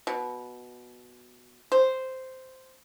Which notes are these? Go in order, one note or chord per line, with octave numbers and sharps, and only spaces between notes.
B2
C5